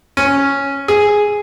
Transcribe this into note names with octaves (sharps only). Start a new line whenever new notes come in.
C#4
G#4